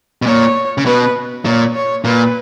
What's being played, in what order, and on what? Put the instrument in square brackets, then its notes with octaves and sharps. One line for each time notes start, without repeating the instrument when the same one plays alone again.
[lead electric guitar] B2
[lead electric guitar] A#2 [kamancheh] C#5
[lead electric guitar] C#3
[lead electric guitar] B2 [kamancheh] B4
[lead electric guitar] A#2 [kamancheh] C#5
[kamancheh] C#5
[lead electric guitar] A#2 [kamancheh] B4